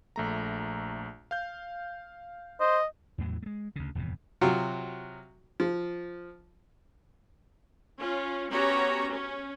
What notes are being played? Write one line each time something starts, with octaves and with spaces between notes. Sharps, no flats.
A#1 A3 A#5
F5 G6
C5 D#5
E2 A2 E3 F#3
G#3 A3
D2 C#3
D#1 E2 G2 C3
C3 F#3 F4 F#4
F3
C#4 F4
B3 C#4 F#4 G4 C#5 A#5
C#4